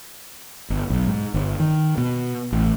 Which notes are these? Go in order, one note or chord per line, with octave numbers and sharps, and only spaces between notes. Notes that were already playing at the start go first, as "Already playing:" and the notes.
G1
B1
G#2
G1
D#3
B2
A1